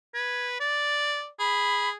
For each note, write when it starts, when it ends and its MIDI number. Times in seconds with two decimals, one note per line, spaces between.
0.14 0.58 71
0.14 0.47 92
0.60 1.28 74
0.60 1.20 93
1.40 1.95 68
1.40 1.90 83